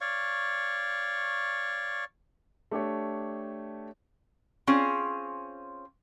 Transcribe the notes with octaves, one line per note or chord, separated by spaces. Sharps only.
C#5 D5 F5 C#6
A3 D4 G4 C#5
C4 C#4 F4 G#4